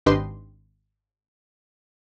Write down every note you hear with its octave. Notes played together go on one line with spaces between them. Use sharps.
G#1 D4 G4 B4 D#5 C6